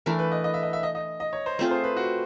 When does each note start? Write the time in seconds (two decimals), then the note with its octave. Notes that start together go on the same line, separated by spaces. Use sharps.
0.06 E3 A3 D4 A#4
0.19 B4
0.32 D#5
0.44 D#5
0.54 E5
0.63 D#5
0.73 E5
0.83 D#5
0.95 D#5
1.20 D#5
1.33 C#5
1.46 C5
1.59 A3 C4 F4 G#4 C5
1.71 C5
1.84 B4
1.97 F#4